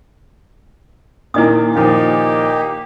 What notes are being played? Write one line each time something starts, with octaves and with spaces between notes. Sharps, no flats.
A#2 D#3 A#3 E4 D#5 D#6
A#2 D#3 F3 A#3 D#4 G4